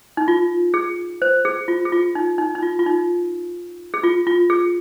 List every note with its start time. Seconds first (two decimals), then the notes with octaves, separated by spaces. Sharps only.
0.17 D#4
0.28 F4
0.74 G#4
1.22 C5
1.45 G#4
1.68 F4
1.85 G#4
1.92 F4
2.15 D#4
2.38 D#4
2.55 D#4
2.63 F4
2.79 F4
2.86 D#4
3.94 G#4
4.04 F4
4.27 F4
4.50 G#4